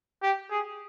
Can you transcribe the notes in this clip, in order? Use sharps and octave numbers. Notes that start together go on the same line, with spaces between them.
G4
G#4